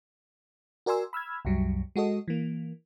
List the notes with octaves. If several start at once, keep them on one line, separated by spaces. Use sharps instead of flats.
F#4 A#4 D5 G#5 C6 E6
B5 E6 F6 G#6
C2 F#2 F#3 G3
G#3 F#4 A4 D#5
E3 A#3